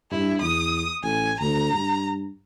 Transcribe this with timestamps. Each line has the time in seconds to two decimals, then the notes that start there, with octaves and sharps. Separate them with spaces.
0.11 G2 E4
0.42 E2 D#6
1.03 A1 G#5
1.40 D2 A#5
1.72 G2